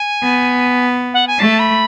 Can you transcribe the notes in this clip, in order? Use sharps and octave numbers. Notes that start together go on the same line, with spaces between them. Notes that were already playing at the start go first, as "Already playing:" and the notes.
Already playing: G#5
B3
F#5
G#5
A3 A5
B5